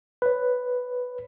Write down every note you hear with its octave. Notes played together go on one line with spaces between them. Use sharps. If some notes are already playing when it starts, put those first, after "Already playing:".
B4 C#5